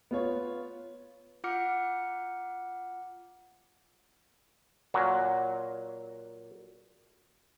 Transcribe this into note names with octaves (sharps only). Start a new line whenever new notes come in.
B3 F4 C#5
F4 F#5 D6 F6 C#7
A#2 F#3